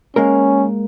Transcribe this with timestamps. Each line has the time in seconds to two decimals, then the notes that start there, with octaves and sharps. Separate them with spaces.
0.16 G#3 A#3 C#4 A#4